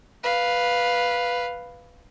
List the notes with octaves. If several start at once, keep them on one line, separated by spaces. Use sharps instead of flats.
B4 F5